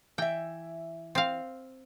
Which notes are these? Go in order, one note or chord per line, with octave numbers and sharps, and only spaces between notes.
E3 E5 G5
C4 F5